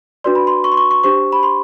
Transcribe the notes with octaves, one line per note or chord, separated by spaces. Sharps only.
D4 F#4 B4 D5 C6
B5
C6
C#6
C6
C#6
C#6
D4 G4 C5 C#6
B5
C6